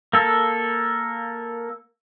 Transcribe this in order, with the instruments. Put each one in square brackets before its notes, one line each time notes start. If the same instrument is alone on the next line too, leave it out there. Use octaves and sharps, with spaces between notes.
[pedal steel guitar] A#3 A4